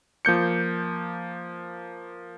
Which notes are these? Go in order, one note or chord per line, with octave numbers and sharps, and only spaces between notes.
F3 A#3 G6 C#7